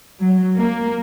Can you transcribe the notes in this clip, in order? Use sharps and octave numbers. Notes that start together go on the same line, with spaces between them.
F#3
A#3